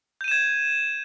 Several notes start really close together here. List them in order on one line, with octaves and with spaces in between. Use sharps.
G6 D#7 E7 G#6